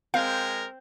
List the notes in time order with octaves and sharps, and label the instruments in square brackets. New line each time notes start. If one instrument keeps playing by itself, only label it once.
[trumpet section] G#3 A#4 [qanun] C4 [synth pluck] F5